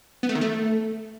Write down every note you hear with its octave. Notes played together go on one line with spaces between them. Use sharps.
B3
A3
D#3
A3